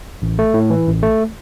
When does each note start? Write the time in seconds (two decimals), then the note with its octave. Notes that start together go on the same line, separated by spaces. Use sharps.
0.22 A1
0.39 A3
0.54 A2
0.70 E3
0.87 A1
1.03 A3